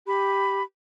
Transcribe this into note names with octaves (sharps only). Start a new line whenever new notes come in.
G4 B5